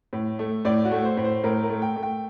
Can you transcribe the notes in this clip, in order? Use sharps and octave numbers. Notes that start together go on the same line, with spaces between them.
A2
A3
A2 D5
F#4
A3
C5
A2
C5
A2 A#4
A#4
A3
G5
A3
G5